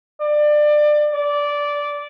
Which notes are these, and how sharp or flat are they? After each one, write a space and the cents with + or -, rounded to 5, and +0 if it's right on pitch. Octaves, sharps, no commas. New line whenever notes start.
D5 +25
D5 -10